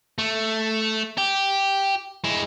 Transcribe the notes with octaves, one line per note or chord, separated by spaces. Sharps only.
A3
G4
G#3 E4